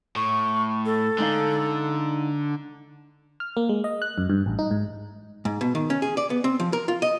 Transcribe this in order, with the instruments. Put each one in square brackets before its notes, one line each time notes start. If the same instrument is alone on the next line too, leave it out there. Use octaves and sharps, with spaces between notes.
[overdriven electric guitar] A2 [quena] C#6
[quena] A4
[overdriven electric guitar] D3 [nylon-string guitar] G#3 D#4 F5
[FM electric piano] F6
A#3
G#3
D#5
F#6
F#2
G2
A1
D#4
G#2
[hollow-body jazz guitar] G#2
B2
D#3
C#4
G#4
D5
B3
C4
F3
A#4
F4
D#5